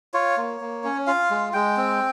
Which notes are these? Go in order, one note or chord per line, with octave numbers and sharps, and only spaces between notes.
F4 C#5
A#3
A#3
C#4
F4 F5
G#3
G#3 G5
C4